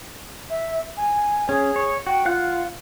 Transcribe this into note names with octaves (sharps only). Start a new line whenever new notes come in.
E5
G#5
C#4 G#4
C#5
F#4 G5
F4 F5 F#5 F#6